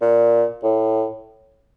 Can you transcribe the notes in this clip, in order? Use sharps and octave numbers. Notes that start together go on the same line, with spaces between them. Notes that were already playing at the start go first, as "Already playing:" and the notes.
A#2
A2